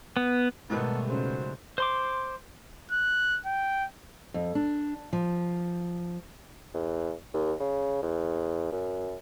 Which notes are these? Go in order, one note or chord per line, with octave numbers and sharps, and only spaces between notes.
B3
G#2 B2 D#3 G3 A3 B3 A4 B4
C#3 F#3 C#4 C5
C5 C6 D6
F#6
G5
F2
D4
F3
E2
D#2
C#3
E2
F#2